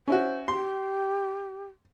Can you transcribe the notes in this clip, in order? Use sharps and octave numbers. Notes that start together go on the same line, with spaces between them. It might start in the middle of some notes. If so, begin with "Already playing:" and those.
C#4 E4 F#4 C5
G4 C6